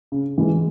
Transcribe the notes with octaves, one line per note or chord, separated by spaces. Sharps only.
C#3
E3 G#3